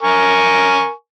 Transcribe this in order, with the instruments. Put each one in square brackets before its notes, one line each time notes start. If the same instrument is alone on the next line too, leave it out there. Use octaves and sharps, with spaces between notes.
[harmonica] A#4 G#5 C#6